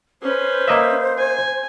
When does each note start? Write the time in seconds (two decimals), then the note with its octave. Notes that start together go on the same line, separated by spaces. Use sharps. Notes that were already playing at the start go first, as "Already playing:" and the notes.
0.22 C#4 B4 C5
0.68 A#3 D#5 E5
1.18 G#5